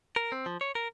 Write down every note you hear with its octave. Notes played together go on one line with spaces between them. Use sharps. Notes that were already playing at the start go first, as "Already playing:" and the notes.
A#4
C4
F3
C#5
A#4